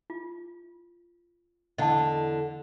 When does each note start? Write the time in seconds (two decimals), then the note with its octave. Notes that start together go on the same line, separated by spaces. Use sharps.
0.10 F4
1.78 E2 D3 D#5 F#5 A5